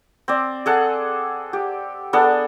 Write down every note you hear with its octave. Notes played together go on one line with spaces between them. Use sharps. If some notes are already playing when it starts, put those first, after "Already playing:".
C4 D5
G#4 A4 F#5
G4
B3 D4 G#4 A4